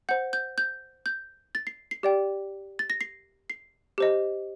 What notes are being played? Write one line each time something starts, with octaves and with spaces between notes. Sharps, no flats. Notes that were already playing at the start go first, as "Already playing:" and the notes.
C5 F#5 G6
G6
G6
G6
A6
C7
C7
G4 D5 G5
A6
A#6
C7
C7
G4 C5 D#5